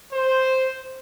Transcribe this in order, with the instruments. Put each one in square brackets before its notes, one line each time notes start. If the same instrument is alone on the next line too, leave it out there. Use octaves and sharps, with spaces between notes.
[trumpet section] C5